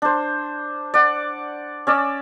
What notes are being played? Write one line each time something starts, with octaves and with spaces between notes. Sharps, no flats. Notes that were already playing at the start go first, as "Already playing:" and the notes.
D4 C5
D5 F#5
C#4 D5 E6